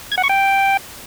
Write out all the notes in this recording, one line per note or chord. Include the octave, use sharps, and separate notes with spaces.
G#6
F#5
C#6
G5